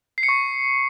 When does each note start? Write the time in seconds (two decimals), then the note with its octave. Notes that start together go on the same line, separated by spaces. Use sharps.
0.18 C7
0.23 C#7
0.29 C#6